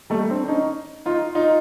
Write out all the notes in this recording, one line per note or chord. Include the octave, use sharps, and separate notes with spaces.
G3 A3
C4 D4
D4
C#4 D#4
D#4 F4
D#4 F4